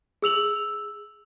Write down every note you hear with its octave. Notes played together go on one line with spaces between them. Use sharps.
G#4 E6 F7 F#7